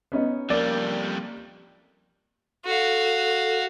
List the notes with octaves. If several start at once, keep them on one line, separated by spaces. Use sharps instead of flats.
B3 C#4 D#4
F2 G3 A#3 D5
F#4 A4 F5